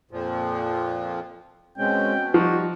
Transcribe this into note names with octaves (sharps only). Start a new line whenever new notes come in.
F2 A#2 F3
B2 G#3 C4 C#4 G5
F3 G3 D#4 F#4